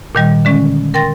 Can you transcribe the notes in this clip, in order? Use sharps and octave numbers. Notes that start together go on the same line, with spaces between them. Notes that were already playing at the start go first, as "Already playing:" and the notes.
A#2 D#3 G3
D3 G#3 C#4
A#4 G5 C6 A6 A#6